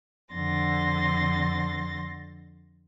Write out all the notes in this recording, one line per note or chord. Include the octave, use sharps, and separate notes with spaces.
F2 D3 C6 A6 A#6